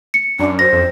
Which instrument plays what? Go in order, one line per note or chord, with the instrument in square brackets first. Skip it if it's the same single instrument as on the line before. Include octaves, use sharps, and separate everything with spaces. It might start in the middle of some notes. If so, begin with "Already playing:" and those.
[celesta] C#7
[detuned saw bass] F#2 [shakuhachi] D4
[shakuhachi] C5 [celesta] A#6
[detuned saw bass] F2